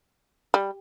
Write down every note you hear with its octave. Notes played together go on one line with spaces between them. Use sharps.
G3